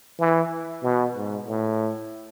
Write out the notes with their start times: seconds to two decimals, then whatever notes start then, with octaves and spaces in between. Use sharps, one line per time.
0.19 E3
0.83 B2
1.15 G#2
1.47 A2